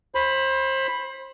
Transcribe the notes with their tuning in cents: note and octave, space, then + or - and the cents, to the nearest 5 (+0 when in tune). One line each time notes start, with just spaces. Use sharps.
C5 +25 B5 +0